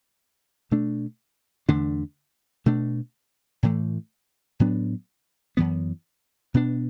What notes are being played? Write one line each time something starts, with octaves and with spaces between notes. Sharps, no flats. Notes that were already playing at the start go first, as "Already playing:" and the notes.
B2 A3 D4
E2 D3 A3 D4
B2 A3 D4
A2 E3 A3
A2 F#3 B3 D4
F#2 E3 B3
B2 B3 D4